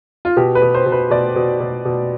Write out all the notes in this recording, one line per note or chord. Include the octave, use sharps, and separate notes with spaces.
F4
B2 G4
B4
B2
C5
B2
B4
B2 D5
B2
B2
B2